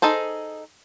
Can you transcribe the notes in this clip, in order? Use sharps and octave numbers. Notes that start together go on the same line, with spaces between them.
D#4 G#4 A4 C5